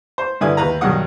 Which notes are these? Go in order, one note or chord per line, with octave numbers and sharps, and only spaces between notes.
C5
G2 D3 E4 B4 G#5 D#6
D#2 B4 A#5
B1 G2 D#3 F#3 F#5 D#6